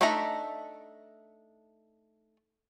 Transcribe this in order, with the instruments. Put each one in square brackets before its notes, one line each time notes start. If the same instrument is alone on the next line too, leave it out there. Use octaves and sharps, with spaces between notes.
[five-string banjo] A3 D4 D#4 E5 A#5